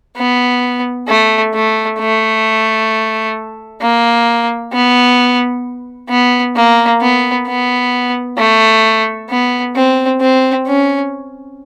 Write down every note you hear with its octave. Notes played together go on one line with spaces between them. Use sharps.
B3
A3
A3
A3
A#3
B3
B3
A#3
B3
B3
A3
B3
C4
C4
C#4